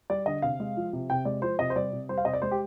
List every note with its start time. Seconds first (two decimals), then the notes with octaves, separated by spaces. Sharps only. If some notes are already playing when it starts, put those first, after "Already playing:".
0.10 G3 D5
0.26 D3 D#5
0.42 C3 F5
0.60 G#3
0.77 F3
0.93 C3
1.10 C3 G5
1.25 G#3 D5
1.42 F3 C5
1.59 C3 D#5
1.70 C5
1.76 G3 D5
1.93 C3
2.09 G3 C5
2.18 F5
2.25 C3 D#5
2.33 D5
2.42 G#3 C5
2.51 G4